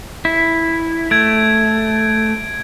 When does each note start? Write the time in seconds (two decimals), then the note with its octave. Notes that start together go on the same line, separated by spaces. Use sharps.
0.25 E4
1.11 A3 G#6 D7